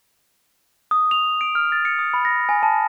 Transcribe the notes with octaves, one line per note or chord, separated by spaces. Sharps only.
D#6
F7
D7
F6
A6
C#7
D#6
B5
A#6
G#5
A5